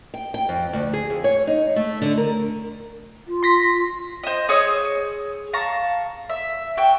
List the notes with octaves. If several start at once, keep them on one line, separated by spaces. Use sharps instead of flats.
G5
G5
F2
D2
G#4
F2
C#5
D#4
A3
D3
A#4
F4
C6 A#6 B6
C5 D#5
G#4 C#5 D#6 E6
F5 A5 A#5 C#6
E5
F#4 G5